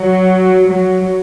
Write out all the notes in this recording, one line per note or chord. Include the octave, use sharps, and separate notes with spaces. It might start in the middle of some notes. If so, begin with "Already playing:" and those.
Already playing: F#3
F#3